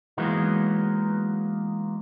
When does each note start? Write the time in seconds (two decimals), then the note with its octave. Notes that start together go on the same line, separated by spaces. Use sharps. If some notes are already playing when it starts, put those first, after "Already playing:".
0.17 E3 F#3 G#3 A#3 B3 D#4